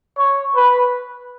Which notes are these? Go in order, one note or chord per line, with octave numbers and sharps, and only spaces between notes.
C#5
B4